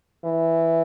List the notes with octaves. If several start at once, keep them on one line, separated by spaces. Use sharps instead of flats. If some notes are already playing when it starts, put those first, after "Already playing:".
E3